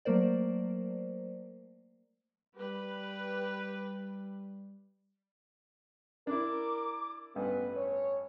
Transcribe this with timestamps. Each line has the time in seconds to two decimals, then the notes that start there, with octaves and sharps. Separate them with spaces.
0.05 F#3 A3 A#3 A#4 C5 D5
2.56 G3 G4 B4
6.27 D4 E4 A#4 D6
7.35 A1 G2 B3 B4
7.76 C#5